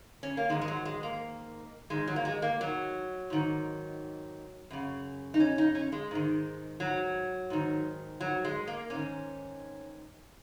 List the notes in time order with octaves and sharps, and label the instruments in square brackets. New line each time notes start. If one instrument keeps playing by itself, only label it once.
[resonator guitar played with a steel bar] C#4
A#3
G#2 D#3 G#3
G#3
F#3
G#3
A#3
G#2 D#3 G#3
F#3
A#3
G#3
A#3
F#3
G#2 D#3
F#2 C#3
D#4
C#4
D#4
C#4
G#3
G#2 D#3
F#3
G#2 D#3
F#3
G#3
A#3
G#2 D#3 C#4